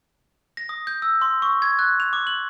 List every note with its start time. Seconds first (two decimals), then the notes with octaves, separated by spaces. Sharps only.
0.57 A#6
0.69 D#6
0.87 G6
1.02 E6
1.22 C6
1.42 C#6
1.62 G#6
1.79 F#6
2.00 F7
2.13 D6
2.27 F#7